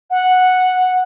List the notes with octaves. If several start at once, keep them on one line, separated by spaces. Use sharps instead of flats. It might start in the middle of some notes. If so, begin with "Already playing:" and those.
F#5